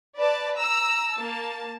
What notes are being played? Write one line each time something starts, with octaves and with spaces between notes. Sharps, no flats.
B4 D5 A5
A#5 E6
A#3 A5